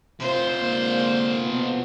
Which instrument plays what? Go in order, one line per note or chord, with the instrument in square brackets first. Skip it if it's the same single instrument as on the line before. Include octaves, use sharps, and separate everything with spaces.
[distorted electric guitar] C3 F4 [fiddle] C5
[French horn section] G#2 D3 A#3
F2 B2 B3